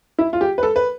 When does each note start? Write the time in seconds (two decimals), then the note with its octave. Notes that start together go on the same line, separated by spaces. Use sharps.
0.19 E4
0.33 F4
0.41 G4
0.58 B4
0.63 A4
0.76 B4